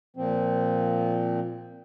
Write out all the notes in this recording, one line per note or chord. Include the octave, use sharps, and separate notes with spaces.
A#2 F3 C4